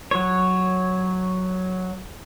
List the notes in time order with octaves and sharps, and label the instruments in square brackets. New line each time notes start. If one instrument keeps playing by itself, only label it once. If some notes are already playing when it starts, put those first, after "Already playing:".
[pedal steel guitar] F#3 C#5